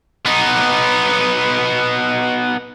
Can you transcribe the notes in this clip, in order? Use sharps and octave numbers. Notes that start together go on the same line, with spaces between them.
B3 D#4